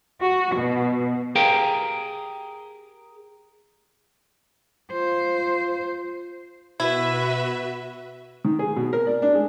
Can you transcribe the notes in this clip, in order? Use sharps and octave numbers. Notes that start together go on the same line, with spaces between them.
F#4
B2
G4 G#4 A#4 F5 G5
F4 C5
B2 E4 F#4 B4 E5
D#3
G#4
B2
A#4
D5
D4
G#3